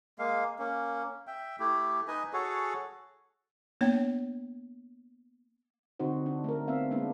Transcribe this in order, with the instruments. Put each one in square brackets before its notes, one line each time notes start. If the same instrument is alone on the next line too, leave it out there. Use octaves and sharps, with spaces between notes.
[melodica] G#3 A#3 F5
A#3 C#4
E5 G5
A3 E4 G4
D#4 B4 D#5 G#5
F#4 G#4 A4 C#5
[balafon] A#3 B3 D4 C#5
[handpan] D3 C4 D#4 F#4 C5
D4
A3 A#4
B3 C4 E5 F5
G#3 A#3 B3 D4